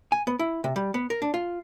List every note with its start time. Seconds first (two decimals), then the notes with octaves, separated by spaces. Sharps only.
0.12 G#5
0.27 B3
0.39 E4
0.64 C3
0.76 G3
0.94 B3
1.10 A#4
1.22 D4
1.34 F4